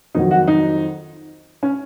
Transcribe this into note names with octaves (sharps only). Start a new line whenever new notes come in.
F2 D#3 F#3 D#4
F#4
D#4
C#4